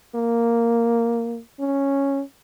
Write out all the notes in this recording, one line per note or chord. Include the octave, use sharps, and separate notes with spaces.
A#3
C#4